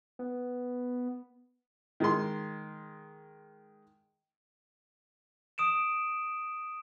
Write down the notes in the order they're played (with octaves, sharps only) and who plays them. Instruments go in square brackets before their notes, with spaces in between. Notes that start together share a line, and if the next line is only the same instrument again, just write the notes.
[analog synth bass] B3
[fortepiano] D#3 G#3 C6
[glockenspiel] D#6 D7 E7